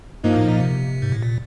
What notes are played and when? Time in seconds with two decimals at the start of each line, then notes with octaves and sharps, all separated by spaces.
0.23 G2 F3 A#3 D#4
0.36 A2
0.48 A#2
0.60 C3
1.02 G#2
1.12 A2
1.23 A#2